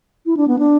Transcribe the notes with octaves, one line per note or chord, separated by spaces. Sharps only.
E4
D4
B3
D4